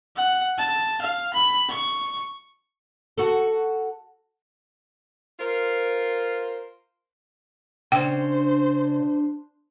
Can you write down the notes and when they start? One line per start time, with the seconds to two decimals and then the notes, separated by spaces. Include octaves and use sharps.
0.16 F#5
0.58 A5
1.01 F5
1.33 B5
1.69 C#6
3.18 F#4 A4
5.39 F4 A#4 C5
7.92 C#3 D4 C5 G5